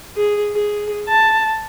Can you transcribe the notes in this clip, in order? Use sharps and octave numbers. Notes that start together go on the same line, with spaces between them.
G#4
G#4
A5